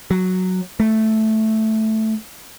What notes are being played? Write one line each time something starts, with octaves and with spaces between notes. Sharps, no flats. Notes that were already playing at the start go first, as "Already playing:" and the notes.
F#3
A3